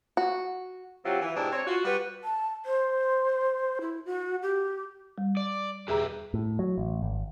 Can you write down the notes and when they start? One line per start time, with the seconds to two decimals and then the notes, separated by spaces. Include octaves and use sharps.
0.17 F#4
1.05 C3 F#3 E4 F4 G4
1.21 E3
1.36 G#2 B2 D4 E4 G4
1.52 C4 C#5
1.67 F4 F#4
1.84 G3 F#4 B4
2.24 A5
2.66 C5
3.81 E4
4.06 F#4
4.42 G4
5.18 G3
5.37 D5
5.88 E2 G4 G#4 B4 E5 A#5
6.34 A2
6.59 F#3
6.78 A1
7.02 G#1